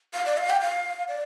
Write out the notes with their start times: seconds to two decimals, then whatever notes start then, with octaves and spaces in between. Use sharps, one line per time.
0.14 F5
0.26 D5
0.37 F5
0.50 G5
0.61 F5
1.08 D5